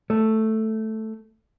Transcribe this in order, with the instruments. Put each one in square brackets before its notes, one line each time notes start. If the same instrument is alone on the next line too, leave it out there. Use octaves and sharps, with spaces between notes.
[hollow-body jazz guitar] A3